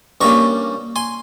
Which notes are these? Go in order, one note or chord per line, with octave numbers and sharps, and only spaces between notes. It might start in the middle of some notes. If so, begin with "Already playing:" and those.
G2 G3 A#3 C#4 A#5 C#6
G#5 C6